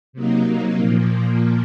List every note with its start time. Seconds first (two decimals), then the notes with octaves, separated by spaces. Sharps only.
0.13 C3 F#3 A#3 D#4
0.77 A#2 F3 A#3